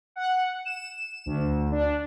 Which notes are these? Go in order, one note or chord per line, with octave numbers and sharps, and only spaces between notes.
F#5
E7
D2
D4